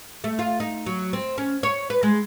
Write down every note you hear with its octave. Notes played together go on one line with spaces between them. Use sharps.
A3
F4
D#4
F#3
C4
C#4
C#5
B4
G#3